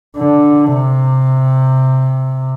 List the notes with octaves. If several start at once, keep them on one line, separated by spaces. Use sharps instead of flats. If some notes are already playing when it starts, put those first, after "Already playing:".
D3
C3